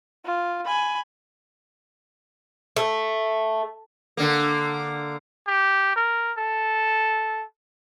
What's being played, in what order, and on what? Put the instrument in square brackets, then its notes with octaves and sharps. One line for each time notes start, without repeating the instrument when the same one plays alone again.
[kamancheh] F4
G#5 B5
[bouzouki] A3
[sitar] D3 A#3
[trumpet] G4
A#4
A4